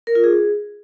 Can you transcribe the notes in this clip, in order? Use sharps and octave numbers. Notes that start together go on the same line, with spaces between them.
A#4
F4
G#4